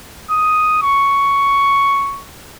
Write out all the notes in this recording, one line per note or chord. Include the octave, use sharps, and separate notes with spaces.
D#6
C#6